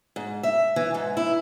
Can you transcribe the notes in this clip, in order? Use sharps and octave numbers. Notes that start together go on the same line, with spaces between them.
G#2
E5
E3
G#2
E4